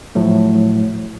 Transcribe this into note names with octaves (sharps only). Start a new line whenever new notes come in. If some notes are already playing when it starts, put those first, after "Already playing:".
A2 F3 F#3 A3